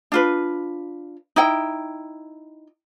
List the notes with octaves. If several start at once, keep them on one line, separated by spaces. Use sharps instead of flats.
D4 F4 B4
D#4 E4 G5